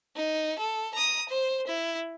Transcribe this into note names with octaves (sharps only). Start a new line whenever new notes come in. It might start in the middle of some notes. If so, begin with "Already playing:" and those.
D#4
A4
A#5 D#6
C5
E4